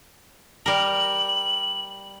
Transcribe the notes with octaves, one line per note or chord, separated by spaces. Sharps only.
G3 A#4 F#7